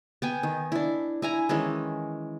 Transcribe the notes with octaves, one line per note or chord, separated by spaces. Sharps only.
B3 G5 G#5
D#3
D4 E4
E4 G#5 A#5
D#3 E3 G#3 C#4